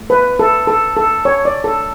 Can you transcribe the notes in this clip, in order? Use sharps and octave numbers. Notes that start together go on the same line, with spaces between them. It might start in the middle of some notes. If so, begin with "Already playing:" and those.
Already playing: A3
B4
A4
A4
A4
C#5
D5
A4